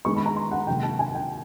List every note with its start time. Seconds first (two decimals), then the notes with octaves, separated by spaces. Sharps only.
0.05 D#3 G#3 B3 C#6
0.16 B5
0.26 A#5
0.36 C6
0.51 F#5
0.67 C3 D#3 F#3 A#3 G5
0.83 A5
0.99 G#5
1.15 G5